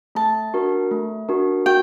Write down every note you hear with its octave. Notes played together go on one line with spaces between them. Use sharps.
A3 A5
D4 F#4 A#4
A3
D4 F#4 A#4
F#4 G5